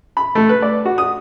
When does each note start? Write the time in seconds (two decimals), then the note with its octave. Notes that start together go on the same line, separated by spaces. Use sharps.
0.17 B5
0.35 A3
0.49 B4
0.62 D5
0.85 F#4
0.98 D#6